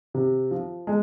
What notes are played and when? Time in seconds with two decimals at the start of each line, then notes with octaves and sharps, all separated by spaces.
0.14 C3
0.51 F3
0.87 G#3